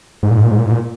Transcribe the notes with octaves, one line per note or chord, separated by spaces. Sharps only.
G#2
A#2
G#2
A#2
G#2
A#2
G#2
A#2